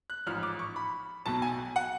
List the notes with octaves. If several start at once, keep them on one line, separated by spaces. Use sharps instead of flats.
F#6
A1 G#2 F3 F6
D6
C#6
B5
B1 B2 F#3 A5
G#5
F#5